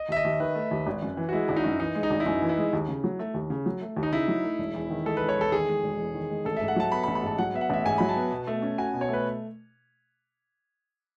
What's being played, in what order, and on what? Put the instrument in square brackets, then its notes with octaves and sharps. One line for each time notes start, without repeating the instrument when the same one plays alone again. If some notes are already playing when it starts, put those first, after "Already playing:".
Already playing: [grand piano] D#5
[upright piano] D#2 [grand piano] E5
[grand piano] D#5
[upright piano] D#2
[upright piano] D#3 [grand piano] B4
[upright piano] A3
D#2
G#1
F#2
E3
[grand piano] F#4
[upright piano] G#3 [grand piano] E4
[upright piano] G#1 [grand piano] E4
[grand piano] D#4
[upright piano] F#2
[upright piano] E3 [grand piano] D#4
[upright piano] G#3
[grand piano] D#4
[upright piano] G#1
[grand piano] E4
[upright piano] F#2 [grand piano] D#4
[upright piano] E3
[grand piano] E4
[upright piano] G#3
D#2
C#3
F#3
A3
D#2
C#3
F#3
A3
D#2
[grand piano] D#4
[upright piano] C#3 [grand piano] E4
[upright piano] F#3
A3
E1
E2
D#3
[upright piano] G#3 [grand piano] A4
[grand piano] B4
[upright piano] E1
[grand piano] C#5
[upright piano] E2 [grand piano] A4
[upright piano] D#3 [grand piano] G#4
[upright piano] G#3
E1
E2
D#3
G#3
[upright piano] A1 [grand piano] A4
[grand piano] E5
[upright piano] G#2
[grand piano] F#5
[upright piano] F#3 [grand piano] A5
[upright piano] B3 [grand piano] B5
[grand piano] B5
[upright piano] A1
[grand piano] B5
[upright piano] G#2 [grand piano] A5
[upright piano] F#3 [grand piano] F#5
[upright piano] B3 [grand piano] E5
[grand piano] F#5
[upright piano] A1 [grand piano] E5
[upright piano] G#2 [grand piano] G#5
[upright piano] F#3 [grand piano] B5
[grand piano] A5
[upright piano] B3
B2
A3
C#4
[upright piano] F#4 [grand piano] G#5
[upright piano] B2
[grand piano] C#5
[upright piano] A3 [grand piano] B4